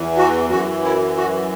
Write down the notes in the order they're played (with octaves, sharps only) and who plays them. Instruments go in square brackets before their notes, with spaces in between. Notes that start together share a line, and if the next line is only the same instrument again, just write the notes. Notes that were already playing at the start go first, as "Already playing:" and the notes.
Already playing: [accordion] E2 E3
F#4
F#2 E3 F#4
E4
F#4